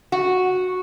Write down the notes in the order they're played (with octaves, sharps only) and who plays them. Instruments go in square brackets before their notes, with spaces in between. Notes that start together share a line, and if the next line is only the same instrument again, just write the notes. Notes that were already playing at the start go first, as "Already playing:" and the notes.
[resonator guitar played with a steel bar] F#4